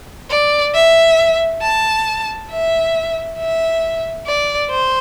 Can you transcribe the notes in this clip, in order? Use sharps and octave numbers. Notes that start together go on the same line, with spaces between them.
D5
E5
A5
E5
E5
D5
C5